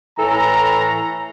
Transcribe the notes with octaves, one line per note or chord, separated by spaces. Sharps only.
A2 E3 A4 A#5